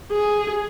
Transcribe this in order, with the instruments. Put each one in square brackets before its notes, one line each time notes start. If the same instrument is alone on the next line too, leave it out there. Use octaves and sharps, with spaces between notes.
[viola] G#4